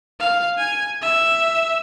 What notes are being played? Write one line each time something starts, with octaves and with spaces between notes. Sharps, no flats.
F5
G#5
E5